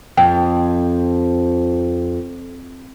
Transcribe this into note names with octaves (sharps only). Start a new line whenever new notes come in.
F2 G5